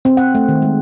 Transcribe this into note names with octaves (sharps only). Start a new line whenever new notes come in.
C4
F#5
A3
D#3
G#3